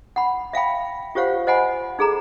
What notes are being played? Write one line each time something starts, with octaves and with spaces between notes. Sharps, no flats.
F#5 B5
E5 F5 G5 B5
F4 G4 C5 C#5 F5 F#5
C5 D#5 F#5 G#5 B5
D#4 G#4 A4 A#5